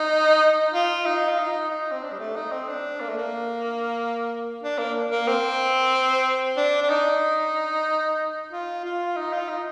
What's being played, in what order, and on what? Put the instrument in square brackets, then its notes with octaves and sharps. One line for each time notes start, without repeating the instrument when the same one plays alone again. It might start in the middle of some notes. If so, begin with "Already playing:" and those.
Already playing: [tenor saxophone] D#4
F4
D#4
F4
D#4
D#4
C4
D4
G3
A3
D#4
C4
D4
A#3
A3
A#3
D4
A#3
A#3
C4
D4
D4
D#4
F4
F4
D#4
F4
D#4